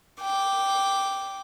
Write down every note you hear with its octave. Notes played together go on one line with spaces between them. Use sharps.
G5 D6